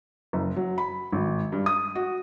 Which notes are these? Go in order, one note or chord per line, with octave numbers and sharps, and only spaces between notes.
F#1
F#3
B5
G#1
G2
D#6
F#4